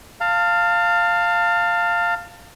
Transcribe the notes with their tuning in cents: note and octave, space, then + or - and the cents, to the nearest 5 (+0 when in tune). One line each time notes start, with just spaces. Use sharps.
F5 +0 A5 +30